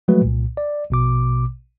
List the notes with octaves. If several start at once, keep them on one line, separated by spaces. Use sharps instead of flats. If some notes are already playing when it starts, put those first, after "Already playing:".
F3 F#3 G#3 A3 F#4 B4
C2 A#2
D5
A#1 B2 D6